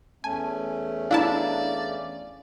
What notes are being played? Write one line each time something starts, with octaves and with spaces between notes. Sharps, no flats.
E2 A3 C#4 G#5 A5
D4 E4 D5 F5 A5 A#5